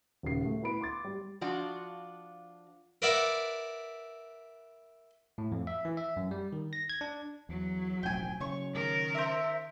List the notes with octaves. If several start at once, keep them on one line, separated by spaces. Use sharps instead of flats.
D#1 C#3 C7
A3
B3 E4 B4 B5 D7
C6 D6 A6
G3
F3 D4 F4 F#4
A#4 B4 D5 E5 F#5
A2
F2
E5
E3
E5
F#2
G3
D#3
A#6
G#6
D4
E2 F#3
E1 A1 F3 G5 G#5
C#3 F#3 C#5 C#6
D#3 A#4
C5 E5